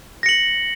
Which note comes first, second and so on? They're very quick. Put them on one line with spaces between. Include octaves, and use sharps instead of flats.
A#6 C#7 F#7